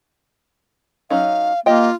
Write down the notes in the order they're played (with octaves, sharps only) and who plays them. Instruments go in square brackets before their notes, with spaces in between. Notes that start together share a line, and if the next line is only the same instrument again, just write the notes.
[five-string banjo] F#3 C#4 D#4 [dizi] F5
[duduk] A#3 [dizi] F4 [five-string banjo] G4 D#5 G5